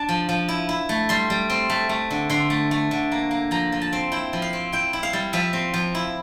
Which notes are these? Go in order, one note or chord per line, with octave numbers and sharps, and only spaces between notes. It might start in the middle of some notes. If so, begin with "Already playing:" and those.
Already playing: D4 A5
F3
F3
E4
E4
A3
G3 C6
G3
C4
A3
A3
D3
D3 C6
A3
A3
D3
A#3
A#3
F3 A#5
F3
A5
C4
E4 G5
F3
F5
C4
E4 G5
E4
F5
G3
F3 E5
C4
F3
E4